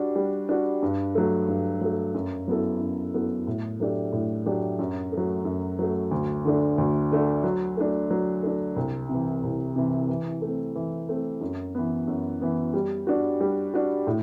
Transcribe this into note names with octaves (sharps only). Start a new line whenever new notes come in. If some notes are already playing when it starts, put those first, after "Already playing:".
Already playing: G3 D4 F#4
G3
D4 F#4
G2
F#3 A3
G2
F#3 A3
F#2
F#3 B3 E4 A4
F#2
F#3 B3 E4 A4
A2
F#3 A3 D4 G4
A2
F#3 A3 D4 G4
F#2
A3
F#3
F#2
F#3 A3
D2
D3 A3 D4
D2
D3 A3 D4
F#3
A3 D4
F#3
A3 D4
C2
C3 E3
C2
C3 E3
E3
A3
C4
E3
A3 C4
F#2
E3 B3
F#2
E3 B3
G3
D4 F#4
G3
D4 F#4
A2